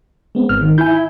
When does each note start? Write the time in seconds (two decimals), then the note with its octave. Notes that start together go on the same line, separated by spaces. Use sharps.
0.35 G#3 B3 C4
0.49 G#1 F6
0.61 D#3
0.78 E4 G#5 G6